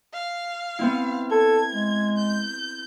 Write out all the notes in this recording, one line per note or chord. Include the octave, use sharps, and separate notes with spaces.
F5
B3 C4 E4
A4 G#6
G#3
G6